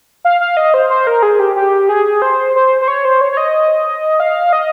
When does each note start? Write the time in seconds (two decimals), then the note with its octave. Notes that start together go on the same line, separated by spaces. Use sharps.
0.25 F5
0.40 F5
0.57 D#5
0.74 C5
0.90 C5
1.07 A#4
1.23 G#4
1.39 G4
1.56 G4
1.89 G#4
2.22 C5
2.56 C5
2.81 C5
2.88 C#5
3.05 C5
3.21 C#5
3.32 C#5
3.37 D#5
4.20 F5
4.53 D#5